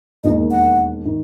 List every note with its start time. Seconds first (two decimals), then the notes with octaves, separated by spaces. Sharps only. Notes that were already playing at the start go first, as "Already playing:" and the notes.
0.24 E1 D#2 D#3 D#5
0.51 F#5
1.05 D#3